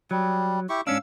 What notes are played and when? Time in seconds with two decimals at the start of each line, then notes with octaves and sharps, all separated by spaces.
0.11 F#3 G3
0.69 E4 G4 C#6
0.87 G#2 C#4 D4 F5 E6